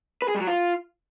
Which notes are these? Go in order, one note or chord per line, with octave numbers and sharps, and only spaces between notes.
B4
G#4
G3
F#3
F4